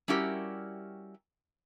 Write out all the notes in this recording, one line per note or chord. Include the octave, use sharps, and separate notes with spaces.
G3 C#4 E4 F#4 G4 A#4